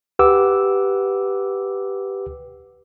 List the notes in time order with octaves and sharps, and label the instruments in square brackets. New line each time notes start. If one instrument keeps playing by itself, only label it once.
[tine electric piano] G4 B4 F#5 D6 E6